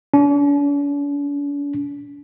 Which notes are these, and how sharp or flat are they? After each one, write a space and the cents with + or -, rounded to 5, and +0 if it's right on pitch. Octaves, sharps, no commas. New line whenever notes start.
D4 -45